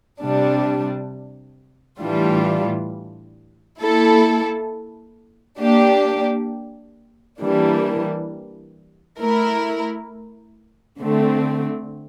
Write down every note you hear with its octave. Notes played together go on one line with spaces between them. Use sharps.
C3 G3 D4
A2 E3 G3 D4 F4
A#3 E4 A4
A#3 D4 G4
E3 G3 A#3 D4
A3 E4 A#4
D3 A3 C4